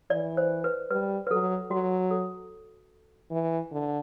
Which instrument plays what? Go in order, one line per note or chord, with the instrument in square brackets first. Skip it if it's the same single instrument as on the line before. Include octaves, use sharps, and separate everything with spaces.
[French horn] E3 [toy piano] D5
[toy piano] C5
B4
[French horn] G3 [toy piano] B4
[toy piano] B4
[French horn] F#3 [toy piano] A4
[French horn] F#3 [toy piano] F#4
[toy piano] A4
[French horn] E3
D3